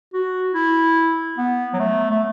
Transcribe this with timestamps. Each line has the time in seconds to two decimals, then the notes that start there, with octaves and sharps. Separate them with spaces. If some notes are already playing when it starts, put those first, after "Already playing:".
0.13 F#4
0.54 E4
1.38 B3
1.73 F#3
1.79 A3
2.11 A3